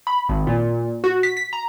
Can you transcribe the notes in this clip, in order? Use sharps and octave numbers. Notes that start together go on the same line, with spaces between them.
B5
G#1
A#2
F#4
B6
B6
A#5